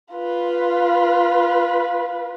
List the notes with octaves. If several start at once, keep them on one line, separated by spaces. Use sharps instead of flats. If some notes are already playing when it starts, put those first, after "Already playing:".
F4 B4